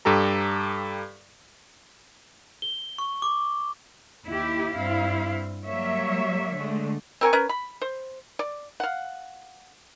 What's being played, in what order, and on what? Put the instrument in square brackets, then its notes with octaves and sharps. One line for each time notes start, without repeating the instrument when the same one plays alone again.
[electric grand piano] G2 G4 A4 A#5
[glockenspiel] G7
C#6
D6
[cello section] D#2 E4 G4
G2 C4 E4 F5
F#3 G3 A#3 C#5 E5
D3 G#3 A3
[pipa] C4 A#4 G#5 C#6
C#4 A#4 B4
B5
C5
D5
F5 F#5